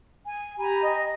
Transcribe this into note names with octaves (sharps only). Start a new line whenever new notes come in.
G#5
G4 G#5 A#5 B5
D#5